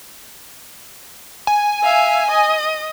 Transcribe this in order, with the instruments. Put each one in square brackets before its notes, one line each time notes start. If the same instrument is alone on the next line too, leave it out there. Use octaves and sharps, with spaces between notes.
[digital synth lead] G#5
[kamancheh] E5 F5
D#5 D#6